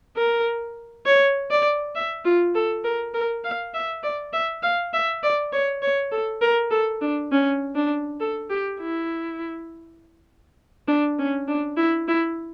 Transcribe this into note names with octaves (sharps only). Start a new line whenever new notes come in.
A#4
C#5
D5
E5
F4
A4
A#4
A#4
F5
E5
D5
E5
F5
E5
D5
C#5
C#5
A4
A#4
A4
D4
C#4
D4
A4
G4
E4
D4
C#4
D4
E4
E4